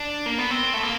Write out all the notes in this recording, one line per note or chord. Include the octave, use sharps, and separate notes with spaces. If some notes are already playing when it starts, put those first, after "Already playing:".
Already playing: D4
A#3
B3
C4
A3
A#3